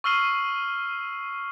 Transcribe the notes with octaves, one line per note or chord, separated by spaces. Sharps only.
C#6 E6 F6 C7 D#7 F#7